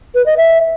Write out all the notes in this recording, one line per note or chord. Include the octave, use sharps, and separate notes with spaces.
B4
D#5
E5